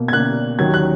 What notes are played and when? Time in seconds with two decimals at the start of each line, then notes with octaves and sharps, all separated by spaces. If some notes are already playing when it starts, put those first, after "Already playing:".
Already playing: B2 A#3
0.08 G#6
0.13 B2 A#3 F#6
0.59 D#2 D#3 F#3 G#6
0.74 F#6